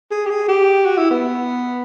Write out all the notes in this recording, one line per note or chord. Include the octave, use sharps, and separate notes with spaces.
G#4
G4
G#4
G4
F#4
E4
B3